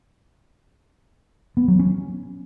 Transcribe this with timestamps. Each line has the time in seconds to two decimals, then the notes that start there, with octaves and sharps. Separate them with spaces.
1.57 B3
1.68 F#3
1.79 C#4